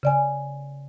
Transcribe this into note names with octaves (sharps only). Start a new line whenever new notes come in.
C#3 D5 G#5